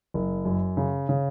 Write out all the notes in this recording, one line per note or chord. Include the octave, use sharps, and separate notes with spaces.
F#1
F#2
C#3
C#3